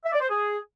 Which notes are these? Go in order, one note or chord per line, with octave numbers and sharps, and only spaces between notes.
E5
D5
C5
G#4